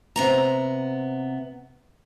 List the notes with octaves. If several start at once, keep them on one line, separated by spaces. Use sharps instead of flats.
C3 B3 A#5